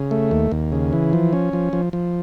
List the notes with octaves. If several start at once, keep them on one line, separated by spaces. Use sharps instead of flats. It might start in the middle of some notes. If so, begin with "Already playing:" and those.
Already playing: C#3
A3
D#2
D#2
C#3
E3
F3
C#4
F3
F3
F3